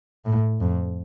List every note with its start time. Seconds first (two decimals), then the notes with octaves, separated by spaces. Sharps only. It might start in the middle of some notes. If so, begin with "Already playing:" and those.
0.25 A2
0.61 F2